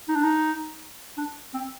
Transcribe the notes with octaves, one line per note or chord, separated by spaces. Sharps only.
D#4
D4
D#4
D4
C4